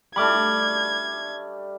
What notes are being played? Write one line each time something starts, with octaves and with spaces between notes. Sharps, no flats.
G3 A3 D4 B5 D6 F6 G#6